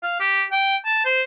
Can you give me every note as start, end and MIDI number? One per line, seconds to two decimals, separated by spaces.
0.03 0.15 77
0.20 0.44 67
0.52 0.76 79
0.85 1.01 81
1.05 1.23 72